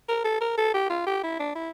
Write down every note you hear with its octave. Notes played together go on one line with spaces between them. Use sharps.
A#4
A4
A#4
A4
G4
F4
G4
E4
D4
E4